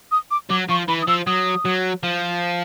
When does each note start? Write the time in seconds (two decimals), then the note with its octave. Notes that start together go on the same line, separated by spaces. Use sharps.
0.12 D#6
0.31 D6
0.50 F#3 D6
0.69 F3 C#6
0.88 E3 B5
1.02 D#6
1.08 F3 E6
1.27 F#3 D#6
1.65 F#3
2.03 F3